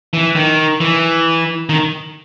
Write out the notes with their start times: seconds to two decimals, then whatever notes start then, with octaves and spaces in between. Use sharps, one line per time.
0.13 E3
0.35 D#3
0.80 E3
1.69 D#3